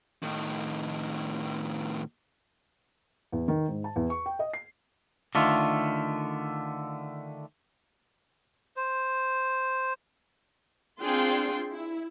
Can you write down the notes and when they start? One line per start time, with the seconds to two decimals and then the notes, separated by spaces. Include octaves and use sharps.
0.23 A2 D#3
3.32 E2
3.48 D#3
3.68 G#2
3.84 A5
3.96 E2
4.10 C#6
4.26 G5
4.39 D#5
4.53 C7
5.35 D3 D#3 A3 F4
8.77 C5
11.01 C4 D4 F4 G#4 G5 C6
11.71 E4